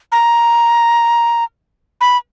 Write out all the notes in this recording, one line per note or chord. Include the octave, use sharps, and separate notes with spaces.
A#5
B5